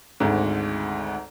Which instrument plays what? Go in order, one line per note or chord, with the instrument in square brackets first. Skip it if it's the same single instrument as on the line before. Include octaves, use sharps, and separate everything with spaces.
[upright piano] G#1 D2 G#2